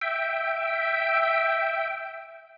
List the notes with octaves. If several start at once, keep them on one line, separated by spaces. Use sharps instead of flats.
E5 G5